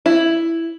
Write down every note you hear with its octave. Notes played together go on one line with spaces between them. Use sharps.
E4